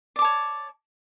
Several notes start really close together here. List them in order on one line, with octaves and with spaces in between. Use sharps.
D5 D6 A5 C#5